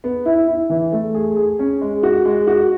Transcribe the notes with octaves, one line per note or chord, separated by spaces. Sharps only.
B3
E4
E4
E3
A3
G#4
G#4
C#4
G#3
F#4
G#3
F#4